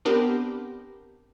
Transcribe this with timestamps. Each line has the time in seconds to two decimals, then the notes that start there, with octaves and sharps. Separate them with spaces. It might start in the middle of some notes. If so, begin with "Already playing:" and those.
0.05 B3 C4 D4 G4 A#4